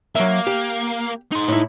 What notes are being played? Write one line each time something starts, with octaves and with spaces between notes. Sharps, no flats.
F#3 A#3 E5
G4
D#4 C6
A2 E4